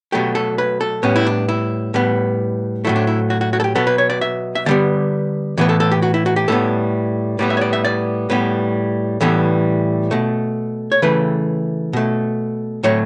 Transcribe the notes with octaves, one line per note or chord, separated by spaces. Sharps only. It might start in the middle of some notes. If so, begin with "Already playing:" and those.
B2 F#3 A3 G4
A4
B4
A4
A2 G3 B3 C#4
E4
D4
E4
A2 G3 B3
A2 F#3 A3 E4
D4
E4
F#4
F#4
F#4
A4
G4
B2 F#3 B3 A4
B4
C#5
D5
E5
E5
D3 G3 B3 D5
A2 E3 B3 B4
A4
A4
G4
F#4
E4
F#4
G4
A2 G3 B3 A4
A2 G3 B3 D5
E5
C#5
D5
E5
D5
A2 G3 B3 B4
A2 E3 G3 B3 A4
B2 A3
C#5
C#3 E3 A3 B4
B2 A3
A2 F#3 A3 C#5